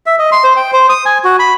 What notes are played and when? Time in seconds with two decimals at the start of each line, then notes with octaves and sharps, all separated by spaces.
0.06 E5
0.19 D#5
0.32 C6
0.44 C5
0.56 G5
0.73 C5
0.89 D#6
1.06 G#5
1.24 F#4
1.39 B5